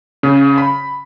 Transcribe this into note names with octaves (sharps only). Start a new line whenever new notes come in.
C#3
B5